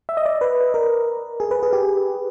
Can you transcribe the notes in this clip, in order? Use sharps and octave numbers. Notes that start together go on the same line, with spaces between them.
E5
D#5
D5
B4
A#4
G#4
B4
G#4
G4